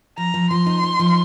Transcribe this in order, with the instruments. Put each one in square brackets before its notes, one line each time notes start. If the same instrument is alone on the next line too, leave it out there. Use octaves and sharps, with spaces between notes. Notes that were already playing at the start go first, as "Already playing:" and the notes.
[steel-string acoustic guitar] F3 [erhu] A#5
[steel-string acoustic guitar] F3
[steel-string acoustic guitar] F3 [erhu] C6
[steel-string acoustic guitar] D#4
D#4
F3